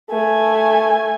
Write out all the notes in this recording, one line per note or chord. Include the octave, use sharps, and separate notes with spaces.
A3 G#5